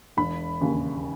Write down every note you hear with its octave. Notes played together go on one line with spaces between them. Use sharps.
E1 B5
D#2 C#3